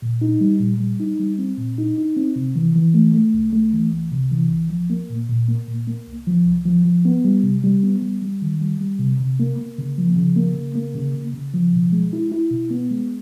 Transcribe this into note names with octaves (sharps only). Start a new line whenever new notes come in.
A#2
D#4
G3
A#2
G3
D#4
G3
C4
A#2
D#4
D#4
C4
C3
E3
E3
A3
A3
C2
A3
E3
C2
C3
E3
C2
F3
A#3
A#2
A#2
A#3
A#2
A#3
C2
F3
C2
F3
F3
B3
G3
C3
G3
B3
G3
G3
D#3
G3
G3
C3
C3
A#3
A#3
C#3
F3
C#3
A#3
C#3
A#3
C#3
C#3
C#3
F3
B2
G#3
E4
E4
B2
B3
G#3